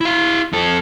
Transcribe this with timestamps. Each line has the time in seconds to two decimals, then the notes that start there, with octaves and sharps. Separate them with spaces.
0.01 E4 F5
0.53 F2 A4